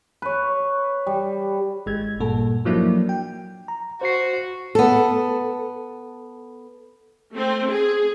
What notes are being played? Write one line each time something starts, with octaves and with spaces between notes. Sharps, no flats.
B4 C#5
G3
G#1 G#3 G#6
G2 A#2 A4
F3 F#3 A#3 D4 E4
G5
A#5
F#4 C5 C7
B3 A4
A3 C4
G#4